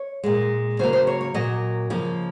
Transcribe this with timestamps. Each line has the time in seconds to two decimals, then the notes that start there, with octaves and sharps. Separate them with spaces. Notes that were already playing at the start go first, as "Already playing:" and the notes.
Already playing: C#5
0.24 A#2 G#3
0.79 C#3 F#3 A#3 C5
0.93 C5
1.07 C#5
1.21 C#5
1.34 A#2 F#3 A#3 D#5
1.90 C#3 F3 A#3